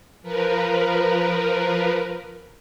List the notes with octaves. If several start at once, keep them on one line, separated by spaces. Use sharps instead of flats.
F3 A#4 B4